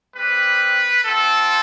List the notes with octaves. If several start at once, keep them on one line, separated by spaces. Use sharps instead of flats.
G3 C4 G4 B4
C4 F4 A4